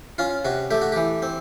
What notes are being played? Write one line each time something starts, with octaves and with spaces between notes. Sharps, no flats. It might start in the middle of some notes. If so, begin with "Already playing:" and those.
C#4 F4
C3 F#4
A3 G4
F#4
E3 G4
C4